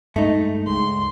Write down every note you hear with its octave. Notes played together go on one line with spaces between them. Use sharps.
G2 G#3 A3 D#4
C#2 G#3 C6